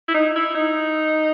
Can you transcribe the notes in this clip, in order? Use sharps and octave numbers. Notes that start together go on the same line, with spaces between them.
E4
D#4
E4
D#4